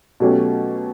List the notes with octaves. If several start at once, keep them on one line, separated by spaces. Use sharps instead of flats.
B2 F#3 A3 C#4 G4